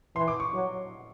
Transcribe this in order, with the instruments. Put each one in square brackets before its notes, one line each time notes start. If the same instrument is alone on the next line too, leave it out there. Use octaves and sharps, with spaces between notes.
[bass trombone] E3 [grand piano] C6
[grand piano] D6
C#6
[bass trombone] F#3